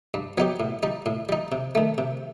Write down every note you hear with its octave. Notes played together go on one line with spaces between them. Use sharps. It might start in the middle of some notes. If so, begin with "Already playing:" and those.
G2
F#3 B3 D#4 G4
A2
G3 D#4
A2
G3 D#4
C3
D#3 A3
C3